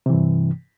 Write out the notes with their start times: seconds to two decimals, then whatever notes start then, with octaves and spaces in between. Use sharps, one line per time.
0.06 C3
0.10 E3
0.13 G2